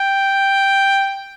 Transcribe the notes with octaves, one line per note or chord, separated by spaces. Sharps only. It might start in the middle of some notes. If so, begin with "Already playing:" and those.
Already playing: G5